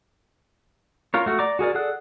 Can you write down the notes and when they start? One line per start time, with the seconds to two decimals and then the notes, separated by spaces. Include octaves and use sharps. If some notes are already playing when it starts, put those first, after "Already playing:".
1.14 F4 A#4 C#5
1.26 A3 F#4
1.39 D5 A#5 D6
1.59 F#4 G#4 A#4 D5
1.75 G#4 A4 D5 F#5 F#6